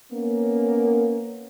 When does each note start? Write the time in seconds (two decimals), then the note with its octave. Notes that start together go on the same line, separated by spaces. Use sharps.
0.12 A#3 B3 C#4